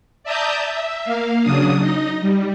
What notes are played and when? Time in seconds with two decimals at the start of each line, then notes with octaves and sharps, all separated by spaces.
0.23 D5 E5 A5 A#5 D#6 G6
0.67 E5
1.04 A#3 F5
1.43 C#3 F#3 D4 D#6
1.80 D#4 D#5
2.21 G3